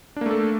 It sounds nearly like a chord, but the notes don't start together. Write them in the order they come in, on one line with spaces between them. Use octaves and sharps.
D4 A#3 A3 A4